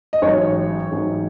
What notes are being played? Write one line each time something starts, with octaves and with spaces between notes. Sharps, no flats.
D#5
A1 G#2 F#3 C#5
A1 G#2 F#3